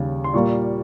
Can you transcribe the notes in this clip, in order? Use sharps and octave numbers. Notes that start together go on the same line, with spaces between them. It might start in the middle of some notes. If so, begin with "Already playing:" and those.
Already playing: D#2 C#3 G3
C6
A#2 G3 A#3 C#6